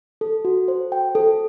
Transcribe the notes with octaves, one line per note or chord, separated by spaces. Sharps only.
A4
F#4
C5
G5
A4